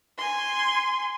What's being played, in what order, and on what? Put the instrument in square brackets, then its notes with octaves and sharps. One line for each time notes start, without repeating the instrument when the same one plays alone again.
[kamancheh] G#5 C6